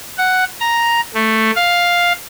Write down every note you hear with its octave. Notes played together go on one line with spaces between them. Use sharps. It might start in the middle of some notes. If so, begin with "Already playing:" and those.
F#5
A#5
A3
F5